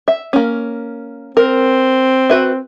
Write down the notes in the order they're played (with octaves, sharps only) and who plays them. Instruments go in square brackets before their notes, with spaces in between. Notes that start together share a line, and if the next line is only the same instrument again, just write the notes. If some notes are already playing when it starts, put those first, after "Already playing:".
[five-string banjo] E5
A#3 C#4
[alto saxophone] C4 [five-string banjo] A#4
[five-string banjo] F#4 B4 E5